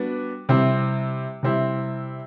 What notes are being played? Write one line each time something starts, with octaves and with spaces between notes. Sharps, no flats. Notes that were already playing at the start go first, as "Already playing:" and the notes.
Already playing: G3 B3 D4 F#4
C3 G3 C4 E4
C3 G3 C4 E4